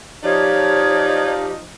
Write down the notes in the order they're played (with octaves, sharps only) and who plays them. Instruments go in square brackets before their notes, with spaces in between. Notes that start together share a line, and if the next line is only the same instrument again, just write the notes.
[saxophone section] F3 D#4 [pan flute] G4 [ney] C#5 [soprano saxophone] D5